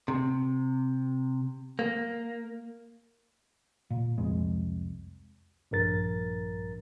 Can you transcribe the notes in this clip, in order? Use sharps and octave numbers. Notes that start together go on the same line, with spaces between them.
C3
A#3
A#2
C2 F2 G#3
A#1 G2 A#4 A6